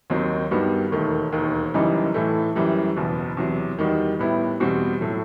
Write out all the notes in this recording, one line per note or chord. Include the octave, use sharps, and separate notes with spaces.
D#2 D#3 F#3 C4 D#4
G2 D#3 G3 B3 F#4
E1 D#2 D#3 A3
E1 D#2 D#3
F#1 F#2 E3 G3 D#4
A2 E3 A3
F#2 E3 G3
F#1 E2 B2
E2 C3 F#3
E2 D#3 G3 D#4 F#4
A2 G3 B3 E4
E2 B2 G3 C4 F#4
A2 F#3 A3